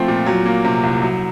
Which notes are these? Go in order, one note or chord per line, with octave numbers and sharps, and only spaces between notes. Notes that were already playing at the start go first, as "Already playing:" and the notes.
Already playing: F3 A3 C4
A#2
F#3
A#3
C3
C2
F#3